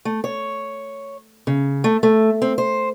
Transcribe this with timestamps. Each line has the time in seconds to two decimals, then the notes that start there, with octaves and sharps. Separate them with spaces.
0.05 A3
0.24 C#5
1.47 C#3
1.84 A3
2.03 A3
2.42 C4
2.58 C5